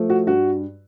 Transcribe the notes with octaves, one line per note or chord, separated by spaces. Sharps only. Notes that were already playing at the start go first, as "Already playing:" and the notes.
Already playing: F3 A3
F#4
G2 F#4